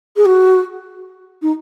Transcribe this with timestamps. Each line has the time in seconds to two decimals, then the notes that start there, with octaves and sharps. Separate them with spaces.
0.16 G#4
0.25 F#4
1.42 D#4